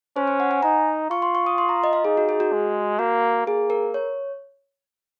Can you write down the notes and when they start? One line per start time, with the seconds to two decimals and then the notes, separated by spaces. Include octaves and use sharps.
0.16 C#4 C5
0.27 C5
0.40 F#5
0.51 G#5
0.63 D#4 A#5
1.11 F4 C#6
1.22 C6
1.35 C#6
1.46 D#6
1.58 C6
1.69 A#5
1.84 D#5
1.93 F5
2.05 D#4 G#4
2.17 F#4
2.29 G#4
2.40 F#4
2.53 G#3
2.99 A#3 F#4
3.47 A#3 G#4
3.70 A#4
3.94 C#5